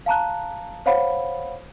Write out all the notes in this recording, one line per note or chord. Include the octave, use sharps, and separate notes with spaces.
F5 A5 A#5 F#6
C5 C#5 F5 F#5 B5